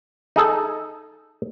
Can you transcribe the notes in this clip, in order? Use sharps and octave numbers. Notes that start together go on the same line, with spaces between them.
D#4 G#4 A4